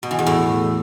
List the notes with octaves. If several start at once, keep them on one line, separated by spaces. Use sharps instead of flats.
B2
E3
E2
A2